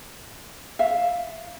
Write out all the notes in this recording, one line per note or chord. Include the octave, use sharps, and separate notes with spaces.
E5 F5